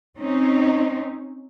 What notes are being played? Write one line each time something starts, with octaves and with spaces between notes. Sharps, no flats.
C4 C#4 D#4